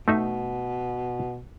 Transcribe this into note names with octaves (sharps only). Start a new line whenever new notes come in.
B2 A3 D#4 E5